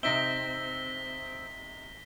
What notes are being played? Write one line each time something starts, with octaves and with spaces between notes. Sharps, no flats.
C3 C4 D#4 E5 A#6 B6 G7